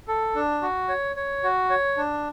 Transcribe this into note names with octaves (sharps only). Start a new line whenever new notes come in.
A4
D4
F#4
C#5
C#5
F#4
C#5
D4